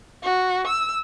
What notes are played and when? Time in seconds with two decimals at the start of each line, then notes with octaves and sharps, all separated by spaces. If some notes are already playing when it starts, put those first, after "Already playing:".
0.23 F#4
0.67 E6